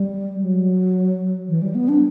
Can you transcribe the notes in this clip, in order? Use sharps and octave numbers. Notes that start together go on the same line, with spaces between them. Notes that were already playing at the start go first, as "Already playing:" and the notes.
Already playing: G3
F#3
E3
G3
B3
D4